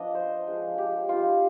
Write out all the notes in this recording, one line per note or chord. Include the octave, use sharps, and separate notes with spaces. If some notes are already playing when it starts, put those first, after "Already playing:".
Already playing: F3 B3 D4 D#5
C5
F3 G#3 D4
G4
G3 C4 D#4 F4